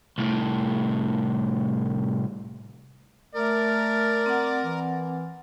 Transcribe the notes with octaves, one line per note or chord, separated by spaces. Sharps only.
C2 A2
A3 A#4 D5
C4 F#5
E3